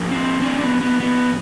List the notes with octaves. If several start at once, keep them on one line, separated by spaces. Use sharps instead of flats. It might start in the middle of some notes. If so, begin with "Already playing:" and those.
Already playing: A2 F3 A#3
C4
C4 D4
B3
B3
B3